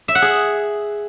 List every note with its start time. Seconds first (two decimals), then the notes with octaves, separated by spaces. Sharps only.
0.08 E5
0.15 F#5
0.22 G#4